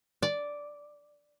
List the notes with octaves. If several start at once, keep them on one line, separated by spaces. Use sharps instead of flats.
D5